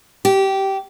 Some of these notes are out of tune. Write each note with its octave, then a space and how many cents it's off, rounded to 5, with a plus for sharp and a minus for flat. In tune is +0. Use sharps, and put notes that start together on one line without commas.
G4 -15